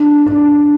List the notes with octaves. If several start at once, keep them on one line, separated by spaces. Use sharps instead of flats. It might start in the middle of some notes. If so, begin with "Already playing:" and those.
Already playing: D4
D4